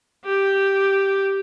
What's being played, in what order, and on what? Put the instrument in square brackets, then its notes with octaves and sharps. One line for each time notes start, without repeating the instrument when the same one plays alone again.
[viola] G4